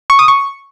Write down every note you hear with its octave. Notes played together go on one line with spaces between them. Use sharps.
C#6
D#6
C#6